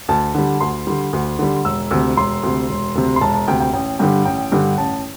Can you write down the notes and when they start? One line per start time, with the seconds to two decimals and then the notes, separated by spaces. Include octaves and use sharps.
0.08 D2 A5
0.35 D3 G3
0.61 D2 C6
0.87 D3 G3
1.13 D2
1.39 D3 G3
1.65 E1 E6
1.91 D2 C3 E6
2.17 E1 C6
2.43 D2 C3
2.69 E1
2.95 D2 C3
3.16 C6
3.21 E1 A5
3.34 A5
3.48 D2 C3 G5
3.60 G5
3.73 A1 G5
3.99 G2 D3 G3 G5
4.25 A1 G5
4.52 G2 D3 G3
4.78 A1 A5